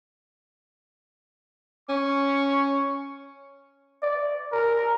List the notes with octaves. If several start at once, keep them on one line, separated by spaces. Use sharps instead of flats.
C#4 C#6
D5
A#4